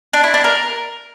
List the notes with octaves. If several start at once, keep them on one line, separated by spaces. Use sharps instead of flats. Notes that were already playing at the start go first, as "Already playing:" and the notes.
D4
E4
D4
A#4